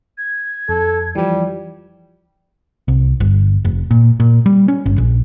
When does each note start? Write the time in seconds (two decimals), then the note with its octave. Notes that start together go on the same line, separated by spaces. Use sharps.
0.18 G#6
0.69 F2 A4
1.15 E3 F3 G3
2.88 C2
3.20 G1
3.65 F1
3.91 A#2
4.20 A#2
4.46 G3
4.68 C#4
4.86 G1
4.98 A#1